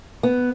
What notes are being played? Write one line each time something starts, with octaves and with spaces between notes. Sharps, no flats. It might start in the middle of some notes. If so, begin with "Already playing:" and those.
B3